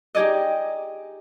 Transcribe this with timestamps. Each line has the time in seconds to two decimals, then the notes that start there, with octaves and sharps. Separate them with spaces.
0.15 D#4 G4 G#4 D5 D#5